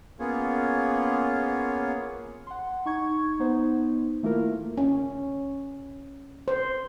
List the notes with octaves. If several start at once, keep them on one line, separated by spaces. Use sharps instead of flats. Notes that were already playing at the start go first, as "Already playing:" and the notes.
A#3 B3 C#4 F4 G#4 C#5
F#5 C6
D#4 C#6 G#6
B3 D#4 C5
D#3 A3 A#3 E4 F4 A#4
C#4
C5